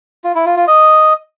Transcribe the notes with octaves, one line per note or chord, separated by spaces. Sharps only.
F4
E4
F4
F4
D#5